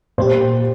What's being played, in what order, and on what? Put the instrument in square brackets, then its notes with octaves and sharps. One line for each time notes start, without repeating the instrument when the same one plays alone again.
[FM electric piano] A#2 A#3 G4 [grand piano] C5